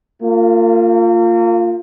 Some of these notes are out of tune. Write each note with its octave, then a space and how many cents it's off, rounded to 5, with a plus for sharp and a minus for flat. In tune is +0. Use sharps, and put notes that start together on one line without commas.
A#3 -40 F4 +0